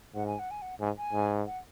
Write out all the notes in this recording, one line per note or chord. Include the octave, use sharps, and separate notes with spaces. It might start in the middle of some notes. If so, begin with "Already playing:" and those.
G#2 F#5
G#5
F#5
G#5
F#5
G#2 G#5
G#5
G#2
F#5